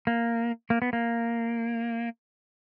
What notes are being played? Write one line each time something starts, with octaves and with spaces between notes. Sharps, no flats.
A#3
A#3
B3
A#3